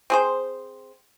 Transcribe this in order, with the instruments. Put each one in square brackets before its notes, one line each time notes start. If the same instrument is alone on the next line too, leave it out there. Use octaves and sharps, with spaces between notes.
[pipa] C4 G#4 C5